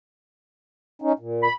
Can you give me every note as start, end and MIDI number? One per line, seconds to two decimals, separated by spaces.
1.02 1.13 61
1.02 1.13 63
1.19 1.48 46
1.43 1.53 83